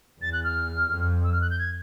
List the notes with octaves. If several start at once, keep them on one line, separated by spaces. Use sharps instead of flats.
E2 A6
F#6
F6
F2
E6
F6
F#6
G6
G#6